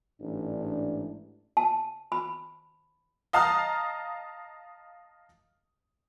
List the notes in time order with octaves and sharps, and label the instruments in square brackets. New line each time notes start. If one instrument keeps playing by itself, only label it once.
[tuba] A1 [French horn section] G#2 D4
[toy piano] A5
B5
[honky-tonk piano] D#5 F5 A5 A#5 D#6 F6